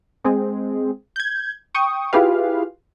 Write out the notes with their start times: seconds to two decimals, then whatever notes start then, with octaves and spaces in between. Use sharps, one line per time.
0.24 G#3 C4 G#4
1.16 G6 G#6
1.75 G5 C#6 D#6
2.13 E4 F4 G4 G#4 B4 F5